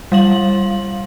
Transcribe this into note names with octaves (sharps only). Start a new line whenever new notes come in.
G3 F5 F#7